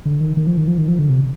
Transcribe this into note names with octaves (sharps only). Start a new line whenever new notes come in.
D3
D#3
D#3
F3
D#3
F3
D#3
F3
D3
C3